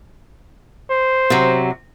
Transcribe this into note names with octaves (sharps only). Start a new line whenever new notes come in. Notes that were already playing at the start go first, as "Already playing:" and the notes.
C5
C3 F#3